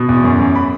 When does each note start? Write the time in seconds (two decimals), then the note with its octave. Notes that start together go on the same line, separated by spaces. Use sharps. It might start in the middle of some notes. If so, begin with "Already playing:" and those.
Already playing: B2
0.09 E2
0.24 F#2
0.39 F#2
0.55 B5